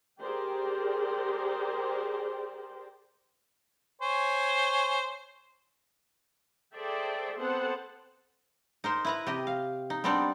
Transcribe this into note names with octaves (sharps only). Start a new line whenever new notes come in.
G4 G#4 A#4 C5 D5 G5
C5 C#5 G#5
G#4 A4 C5 D5 E5 G5
B3 C4 A4 C5 F#5
D#4 A#4 C5
E4 B4 A#5
C3 G4 D#5
F5
D#4
G3 B3 C4 D4 D#4 D5